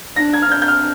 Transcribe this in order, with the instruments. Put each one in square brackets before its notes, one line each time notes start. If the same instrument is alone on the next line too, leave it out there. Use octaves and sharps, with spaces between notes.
[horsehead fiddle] D4 [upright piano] A#6
[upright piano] G#6
F6
[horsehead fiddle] D4 [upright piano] G6
[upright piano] G6
F6